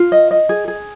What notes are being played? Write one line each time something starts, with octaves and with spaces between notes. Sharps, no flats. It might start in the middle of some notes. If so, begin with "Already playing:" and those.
Already playing: F4
D#5
D#5
G#4
G#4